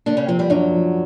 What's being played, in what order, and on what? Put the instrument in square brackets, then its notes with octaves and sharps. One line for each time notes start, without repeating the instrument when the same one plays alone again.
[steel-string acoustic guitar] D3 D4 [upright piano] A#3
[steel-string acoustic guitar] C#3 C#4
[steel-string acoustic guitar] C3 C4 [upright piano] F3
[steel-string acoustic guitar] G2 G3
[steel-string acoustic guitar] F#2 F#3 [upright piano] D4
[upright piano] F3